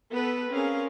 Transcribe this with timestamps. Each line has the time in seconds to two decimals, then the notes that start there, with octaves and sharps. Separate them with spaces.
0.12 B3 A4 B4
0.49 C4 C#4 G#4 A#4 F5